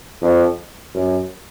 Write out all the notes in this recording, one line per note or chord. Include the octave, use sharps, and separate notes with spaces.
F2
F#2